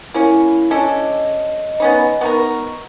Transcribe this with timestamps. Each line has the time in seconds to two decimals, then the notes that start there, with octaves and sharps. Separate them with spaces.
0.14 A#3 C#4 E4
0.71 C#4 D4 A4 D#5
1.80 B3 C#4 D#4
2.21 B3 D#4 A#4 C#6